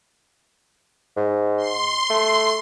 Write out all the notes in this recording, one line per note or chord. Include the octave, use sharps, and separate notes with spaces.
G#2
C6
A3